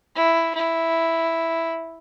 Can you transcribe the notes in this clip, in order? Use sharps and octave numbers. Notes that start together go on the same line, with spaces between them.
E4
E4